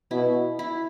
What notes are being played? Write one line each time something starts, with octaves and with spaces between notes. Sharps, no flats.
B2 E4
E4